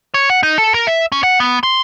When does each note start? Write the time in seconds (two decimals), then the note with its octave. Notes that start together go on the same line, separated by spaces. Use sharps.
0.14 C#5
0.30 F#5
0.43 D#4
0.58 A4
0.74 A#4
0.87 E5
1.12 C#4
1.23 F#5
1.40 B3
1.63 C6